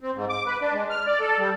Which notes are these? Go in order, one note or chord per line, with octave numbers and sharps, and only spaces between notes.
C4
G#2
D6
B4
D4
G#3
F6
D5
A4
G3